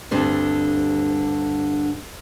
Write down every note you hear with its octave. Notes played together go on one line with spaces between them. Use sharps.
D2 G2 D3 G3 C4